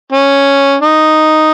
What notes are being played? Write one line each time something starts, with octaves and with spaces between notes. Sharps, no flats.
C#4
D#4